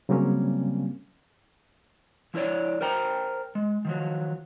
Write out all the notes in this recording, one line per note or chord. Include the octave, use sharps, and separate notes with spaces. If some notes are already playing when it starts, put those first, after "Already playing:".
C#3 F#3 G3 A#3 C4 C#4
F3 E4 A#4 C#5 D5
A#4 C5 G5 A#5
G#3
D#3 F3 F#3